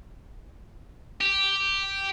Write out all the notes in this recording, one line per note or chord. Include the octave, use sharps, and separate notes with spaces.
G4